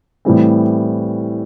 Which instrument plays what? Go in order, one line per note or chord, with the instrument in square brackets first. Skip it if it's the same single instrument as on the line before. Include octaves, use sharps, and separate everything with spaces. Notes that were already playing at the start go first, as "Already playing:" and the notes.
[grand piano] A2 E3 G3 C4